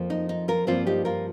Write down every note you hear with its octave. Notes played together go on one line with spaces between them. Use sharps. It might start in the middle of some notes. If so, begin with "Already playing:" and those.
Already playing: F2 F3 A#3
D#4
D#4
F4 A#4
G2 F3 A#3 C4 F4
D#4 G4
F4 A#4